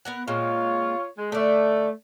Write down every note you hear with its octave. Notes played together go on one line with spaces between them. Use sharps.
B3 A#4 F#5
A#2 G#3 C4 F4 C#5
G#3
D3 A3 D5